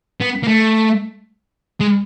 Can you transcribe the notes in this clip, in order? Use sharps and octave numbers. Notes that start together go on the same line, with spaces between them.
B3
A#3
A3
G#3